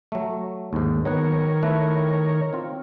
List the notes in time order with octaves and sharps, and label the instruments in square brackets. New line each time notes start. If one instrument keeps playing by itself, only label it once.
[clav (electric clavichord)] F#3 A3
D#2 G#2
[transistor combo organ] D#3 A#4 C#5 [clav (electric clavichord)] F#3 B3 F#5
[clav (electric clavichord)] A3 E4 B4
C4 F4